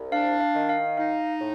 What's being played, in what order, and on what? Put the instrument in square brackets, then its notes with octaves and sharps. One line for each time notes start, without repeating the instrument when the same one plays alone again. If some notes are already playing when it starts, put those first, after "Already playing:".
Already playing: [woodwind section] C2
[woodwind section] D4 [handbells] F5
[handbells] F5
[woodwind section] D#3
[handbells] F5
[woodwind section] D#4 [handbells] F5
[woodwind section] A2